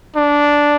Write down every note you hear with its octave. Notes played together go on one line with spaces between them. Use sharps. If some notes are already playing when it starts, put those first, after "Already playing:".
D4